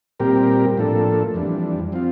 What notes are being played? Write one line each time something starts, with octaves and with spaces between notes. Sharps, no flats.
A#2 G3 C4 G4 A#4
A2 F3 A#3 D4 A4
F2 E3 G3 D4
F3 C4 F4